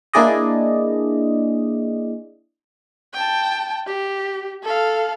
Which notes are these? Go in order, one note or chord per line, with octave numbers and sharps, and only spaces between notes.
A#3 D4 E4 G#4 D5 D#5
G5 A5
G4
A4 F5